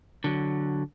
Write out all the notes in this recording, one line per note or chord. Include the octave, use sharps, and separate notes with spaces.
D3 F#3